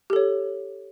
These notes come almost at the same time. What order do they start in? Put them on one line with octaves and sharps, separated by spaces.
G4 A4 C#5